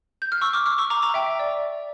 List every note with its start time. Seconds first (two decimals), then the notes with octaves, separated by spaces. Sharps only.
0.22 G6
0.32 F6
0.41 C#6 E6
0.53 D6 F6
0.66 D6 F6
0.78 C#6 E6
0.90 A#5 D6
1.02 A#5 D6
1.14 E5 G5
1.26 E5
1.39 D5